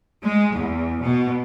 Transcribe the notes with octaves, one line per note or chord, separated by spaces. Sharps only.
G#3
E2
B2